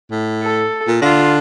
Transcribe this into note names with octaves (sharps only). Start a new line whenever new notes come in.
A2
A4
A#2
D3 F4